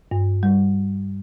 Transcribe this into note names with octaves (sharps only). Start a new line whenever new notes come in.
G2
G3